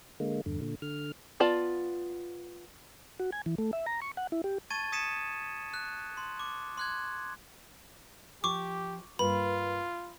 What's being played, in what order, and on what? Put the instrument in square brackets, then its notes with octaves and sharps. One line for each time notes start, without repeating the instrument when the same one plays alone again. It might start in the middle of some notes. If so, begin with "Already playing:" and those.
[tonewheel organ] D3 G#3 A#3
E2 G2 D3
A#2 D3
D3 F6
[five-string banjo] B3 F4 D5 A5
[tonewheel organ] F#4
G#5
E3
A3
E5
A#5
C#6
F#5
E4
G4
[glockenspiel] A5 C#6 G#6 A6 D#7
D#6 G#6 B6 C#7 D#7 E7
F#6
C6
D6
C6 F#6 G#6
[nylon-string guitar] F3 [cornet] G4 [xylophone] C#6 D6
[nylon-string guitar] G2 A#3 B4 [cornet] F4 [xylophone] B5